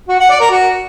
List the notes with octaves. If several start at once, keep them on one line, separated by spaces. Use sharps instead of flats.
F#4
F#5
D5
A#4
F#4